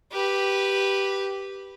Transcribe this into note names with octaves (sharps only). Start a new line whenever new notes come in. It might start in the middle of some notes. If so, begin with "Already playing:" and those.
G4 B4